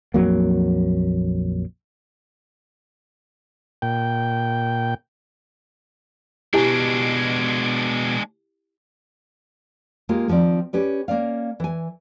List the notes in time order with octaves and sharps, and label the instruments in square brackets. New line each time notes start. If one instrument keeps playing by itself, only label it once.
[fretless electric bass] A#1 F2 F#3 A#3
[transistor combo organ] A#2 G5
[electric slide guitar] B2 B3 F#4 [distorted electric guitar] G#3 D4 [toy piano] E4 G4 G#5
[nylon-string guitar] G#3 A#3 F4 G4
D#3 F3 A3 C4 D5
C#4 G4 B4 D5
A#3 C#4 D5 F5
E3 G#5